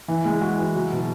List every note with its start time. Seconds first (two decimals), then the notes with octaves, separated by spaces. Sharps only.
0.08 E3
0.25 G#3
0.41 F#4
0.59 E3
0.76 F#3
0.92 B2